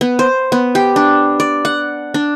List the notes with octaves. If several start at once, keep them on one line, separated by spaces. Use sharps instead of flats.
B3
C5
B3
G4
D4
D5
F#5
D4